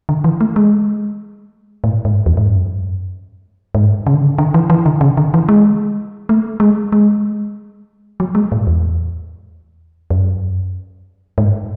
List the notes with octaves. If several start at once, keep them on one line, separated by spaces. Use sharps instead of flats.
D3
E3
A3
G#3
A2
G#2
E2
G#2
F#2
G#2
C#3
D3
C#3
D3
E3
E3
D3
C#3
D3
E3
G#3
A3
G#3
G#3
F#3
G#3
A2
E2
F#2
G#2